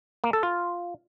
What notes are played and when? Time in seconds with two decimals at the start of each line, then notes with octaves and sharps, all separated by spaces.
0.24 A#3
0.33 A4
0.43 F4